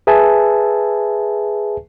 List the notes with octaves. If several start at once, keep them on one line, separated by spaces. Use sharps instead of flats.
G#4 B4 E5 G#5 A5